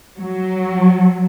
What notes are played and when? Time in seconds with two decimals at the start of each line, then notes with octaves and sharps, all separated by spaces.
0.17 F#3